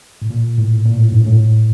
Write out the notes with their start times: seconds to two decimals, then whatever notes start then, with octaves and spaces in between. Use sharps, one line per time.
0.22 A2
0.31 A#2
0.58 A2
0.85 A#2
0.98 A2
1.12 G2
1.26 A2